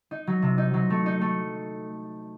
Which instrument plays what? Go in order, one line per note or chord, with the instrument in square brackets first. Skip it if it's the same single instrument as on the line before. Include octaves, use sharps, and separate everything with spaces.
[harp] D#4
F#3
C3
D#4
F#3
A3
D#4
A3